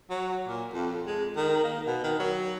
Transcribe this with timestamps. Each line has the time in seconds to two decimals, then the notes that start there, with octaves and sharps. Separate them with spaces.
0.10 F#3
0.48 A#2
0.73 F2
1.07 G#3
1.36 D#3
1.64 A#3
1.87 B2
2.03 D#3
2.19 F#3